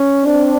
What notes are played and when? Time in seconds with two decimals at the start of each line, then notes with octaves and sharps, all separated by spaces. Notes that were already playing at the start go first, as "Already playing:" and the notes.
Already playing: C#4
0.24 C4 D4